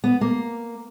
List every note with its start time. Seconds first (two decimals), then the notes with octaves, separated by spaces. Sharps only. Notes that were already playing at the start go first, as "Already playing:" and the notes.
0.04 B3
0.21 A#3